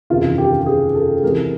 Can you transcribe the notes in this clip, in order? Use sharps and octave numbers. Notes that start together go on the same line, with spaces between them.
F#1 E2 C3 D#3 F4
G4
G4
G#4
A4
C2 C3 E3 G#3 A#4